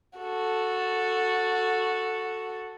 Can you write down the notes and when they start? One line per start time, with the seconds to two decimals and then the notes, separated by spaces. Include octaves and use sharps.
0.18 F#4 A4